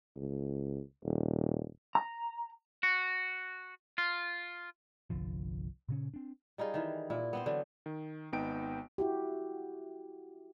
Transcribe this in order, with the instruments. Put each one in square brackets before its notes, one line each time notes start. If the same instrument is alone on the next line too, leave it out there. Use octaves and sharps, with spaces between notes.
[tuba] C#2
D#1
[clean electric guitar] A#5
F#4
F4
[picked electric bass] G1 C2 D3 F3
A#2 C#3 C#4
C4 D4
[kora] G3 D#4 F4 G#4
D#3 E3
A#2 E4
B3 C4 C5
D3 E3 F#3
[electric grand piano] D#3
G#1 B3 D#4 G5 D7
[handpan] E4 F#4 G4